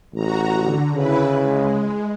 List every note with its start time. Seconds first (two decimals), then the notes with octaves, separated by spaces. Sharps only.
0.15 A1 F#4 A#5
0.61 D3
0.94 C#3 E4 B4
1.40 G#3